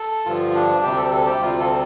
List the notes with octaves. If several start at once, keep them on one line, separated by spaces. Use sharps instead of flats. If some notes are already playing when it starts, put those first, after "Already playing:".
Already playing: A4
G2 D3 F3 F4
D4
D2 C3 G3 G4
A4
A4
G4
D2 C3 G3 F4
A4